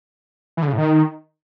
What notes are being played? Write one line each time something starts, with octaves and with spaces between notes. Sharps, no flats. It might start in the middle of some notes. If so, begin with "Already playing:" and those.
E3
D3
C#3
A2
D#3